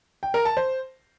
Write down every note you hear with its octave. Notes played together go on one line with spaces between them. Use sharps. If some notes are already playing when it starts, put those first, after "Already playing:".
G5
A#4
A5
C5